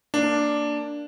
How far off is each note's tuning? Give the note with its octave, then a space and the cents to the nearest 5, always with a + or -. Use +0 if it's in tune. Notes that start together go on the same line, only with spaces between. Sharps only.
A#3 -15 D4 +0